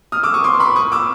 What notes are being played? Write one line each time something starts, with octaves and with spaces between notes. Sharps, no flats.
D#6 F6
D6 E6
C#6 D#6
C6 D6
B5 C#6
C#6 D#6
D6 E6